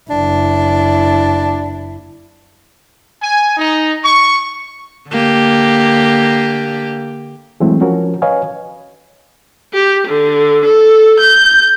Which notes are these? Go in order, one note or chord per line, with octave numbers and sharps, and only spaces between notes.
F#1 D4 E4
G#5
D#4
C#6
D3 A#3 G4
E3 F#3 G#3 A3 C4 E4
F3 C#4 F#4 A#4
B4 C#5 D#5 F5 G#5
G4
D3
A4
G6